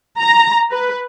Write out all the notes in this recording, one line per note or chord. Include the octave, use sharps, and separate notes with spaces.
A#5
B4